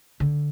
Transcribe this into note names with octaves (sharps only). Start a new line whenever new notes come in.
D3